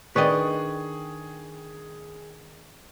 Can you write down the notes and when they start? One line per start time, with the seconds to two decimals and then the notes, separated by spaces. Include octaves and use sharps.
0.16 D#3 D4 G#4 B4 D5 D#5 G5 C#6